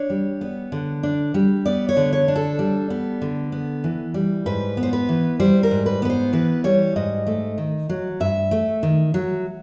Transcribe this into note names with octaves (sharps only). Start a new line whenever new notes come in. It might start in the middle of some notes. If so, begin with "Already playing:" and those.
Already playing: D4 C#5
G3
B3
D3
D4
G3
B3 D5
C#5
D3
C#5
D4
A4
G3
B3
D3
B3
E3
G3
G#2 B4
B3
C5
B4
E3
G3 C5
A#4
G#2
B4
B3 B4
C5
E3 B4
G3 C#5
G#2 D#5
A3
D#3
F#3
G2 E5
A3
D#3
F#3